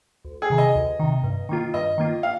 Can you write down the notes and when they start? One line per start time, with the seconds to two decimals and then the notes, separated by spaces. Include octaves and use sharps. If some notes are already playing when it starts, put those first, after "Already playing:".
0.25 D2
0.42 G#4
0.50 C3 D#3
0.58 D#5
0.75 D2
0.99 C3 D#3
1.24 G2
1.49 D#3 A#3 F4
1.74 G2 D#5
1.98 D#3 A#3 F4
2.23 F5